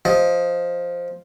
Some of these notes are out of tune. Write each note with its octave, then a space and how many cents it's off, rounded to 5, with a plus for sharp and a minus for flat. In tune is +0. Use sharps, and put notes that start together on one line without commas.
F3 +0 D#5 +0